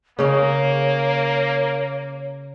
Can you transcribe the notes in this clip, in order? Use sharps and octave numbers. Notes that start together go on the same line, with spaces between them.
C#3 A#3 C#4 C#5